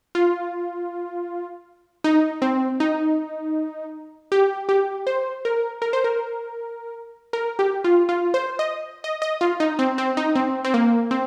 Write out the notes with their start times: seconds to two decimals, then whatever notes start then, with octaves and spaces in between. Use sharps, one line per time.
0.15 F4
2.04 D#4
2.42 C4
2.80 D#4
4.32 G4
4.69 G4
5.07 C5
5.45 A#4
5.82 A#4
5.93 C5
6.04 A#4
7.33 A#4
7.59 G4
7.84 F4
8.09 F4
8.34 C5
8.59 D#5
9.04 D#5
9.22 D#5
9.41 F4
9.60 D#4
9.79 C4
9.98 C4
10.17 D#4
10.36 C4
10.65 C4
10.74 A#3
11.11 C4